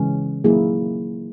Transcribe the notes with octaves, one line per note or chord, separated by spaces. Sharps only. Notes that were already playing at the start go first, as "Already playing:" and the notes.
Already playing: C#3 E3 G#3 C#4
F#3 A#3 E4 G#4